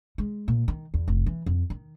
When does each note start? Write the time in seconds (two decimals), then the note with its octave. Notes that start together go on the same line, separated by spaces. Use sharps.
0.18 G#3
0.48 A#2
0.68 D#3
0.94 E2
1.08 F1
1.26 E3
1.46 F2
1.70 D#3